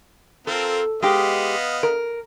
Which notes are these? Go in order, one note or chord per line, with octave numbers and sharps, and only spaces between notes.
C4 F4 A4 A#4
G#3 B3 G4 D#5 F5
A#4